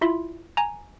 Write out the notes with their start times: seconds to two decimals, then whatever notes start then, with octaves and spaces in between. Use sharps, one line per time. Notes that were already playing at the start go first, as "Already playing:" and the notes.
0.01 E4 F4 E5 B5 C6
0.57 G#5 A#5